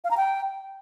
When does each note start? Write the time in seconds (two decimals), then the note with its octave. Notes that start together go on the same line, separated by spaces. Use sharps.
0.04 F5
0.11 A#5
0.17 G5